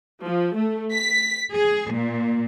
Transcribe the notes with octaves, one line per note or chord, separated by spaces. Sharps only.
F3
A3
B6
G#4
A#2